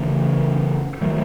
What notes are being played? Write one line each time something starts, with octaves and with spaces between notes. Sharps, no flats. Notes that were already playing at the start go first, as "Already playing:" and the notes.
Already playing: C#3 E3 A3 C#4
D#3 F#3 A3